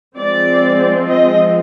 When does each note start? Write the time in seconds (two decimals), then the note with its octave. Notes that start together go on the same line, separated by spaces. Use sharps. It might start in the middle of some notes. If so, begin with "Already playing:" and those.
0.16 F3 G#3 C4 D5
1.07 D#5